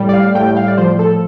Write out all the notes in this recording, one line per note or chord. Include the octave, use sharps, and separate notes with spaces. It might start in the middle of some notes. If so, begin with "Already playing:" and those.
Already playing: A2 G3
D5
F5
A2 G5
F5
D5
F3 C5
A4